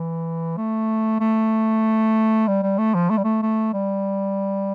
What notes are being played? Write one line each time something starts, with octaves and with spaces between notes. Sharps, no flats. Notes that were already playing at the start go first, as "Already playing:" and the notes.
Already playing: E3
A3
A3
G3
G3
A3
F3
A3
G3
A3
A3
G3